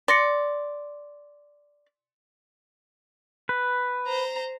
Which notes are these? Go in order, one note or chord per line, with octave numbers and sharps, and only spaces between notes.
D5 C6 A#6 C#7
B4
C5 A#5